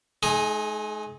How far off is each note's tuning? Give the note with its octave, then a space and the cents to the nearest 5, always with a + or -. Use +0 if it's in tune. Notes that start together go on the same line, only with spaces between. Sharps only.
G#3 +45 D#4 +0 G#4 -5